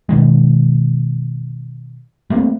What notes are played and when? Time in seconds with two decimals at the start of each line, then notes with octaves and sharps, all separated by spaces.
0.09 B2 D#3 G#3
2.30 G3 A3 A#3 C4